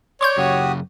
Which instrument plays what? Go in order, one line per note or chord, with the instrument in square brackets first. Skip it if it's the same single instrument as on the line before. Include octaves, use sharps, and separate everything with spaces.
[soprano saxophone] C#5 [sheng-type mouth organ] D5 [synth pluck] C6 C#6 G6
[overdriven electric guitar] F#2 C#3 [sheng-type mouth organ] F#4 G4 D#6